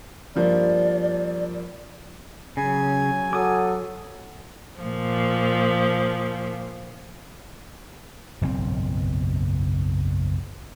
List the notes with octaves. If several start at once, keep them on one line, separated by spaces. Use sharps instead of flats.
G2 F3 A#3 D5
C#3 F#3 G#5
F#3 A4 D6 D#6
A#2 F3
F#1 B1 G#2 C4